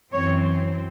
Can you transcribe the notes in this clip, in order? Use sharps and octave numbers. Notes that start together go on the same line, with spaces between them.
F#2 E3 C4 C#5